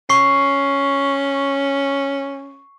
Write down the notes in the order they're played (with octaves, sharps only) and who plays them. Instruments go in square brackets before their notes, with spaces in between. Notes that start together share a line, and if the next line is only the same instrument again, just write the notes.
[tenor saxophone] C#4 [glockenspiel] C#6 C7